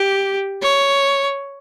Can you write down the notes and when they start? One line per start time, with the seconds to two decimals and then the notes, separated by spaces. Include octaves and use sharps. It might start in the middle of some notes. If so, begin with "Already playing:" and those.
Already playing: G4
0.63 C#5